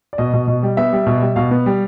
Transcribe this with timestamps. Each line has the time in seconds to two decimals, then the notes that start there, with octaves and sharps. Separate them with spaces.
0.13 D5
0.18 B2 D#5
0.34 B2
0.48 B2
0.63 G3
0.77 B3 E5
0.93 G3
1.07 B2
1.22 G3
1.36 B2 F5
1.51 B3
1.66 G3